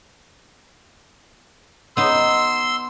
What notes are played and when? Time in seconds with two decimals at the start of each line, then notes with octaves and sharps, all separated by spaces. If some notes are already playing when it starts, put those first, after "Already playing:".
1.97 B3 D#4 C6 E6